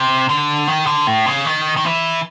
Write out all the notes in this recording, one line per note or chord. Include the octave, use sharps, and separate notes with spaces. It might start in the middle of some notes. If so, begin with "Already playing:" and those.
Already playing: C3
D3
D#3
D3
A2
C#3
D#3
D#3
E3